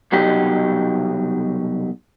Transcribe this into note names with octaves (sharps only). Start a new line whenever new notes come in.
C2 B2 F#3 D#4 G4